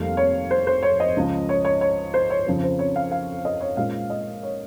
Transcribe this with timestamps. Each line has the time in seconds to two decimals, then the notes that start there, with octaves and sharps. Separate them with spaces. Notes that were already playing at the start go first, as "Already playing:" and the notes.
Already playing: F1 F2 D#3 G3 A#3 F5
0.17 C#5
0.51 C5
0.67 C5
0.83 C#5
1.00 D#5
1.16 C#2 C#3 F3
1.49 C#5
1.65 C#5
1.81 C#5
2.14 C5
2.30 C#5
2.46 F2 C#3 F3 C4
2.63 C5
2.79 C#5
2.96 F5
3.11 F5
3.45 D#5
3.61 C#5
3.77 A#2 G#3 C#4 F4 F5
4.10 D#5
4.43 C#5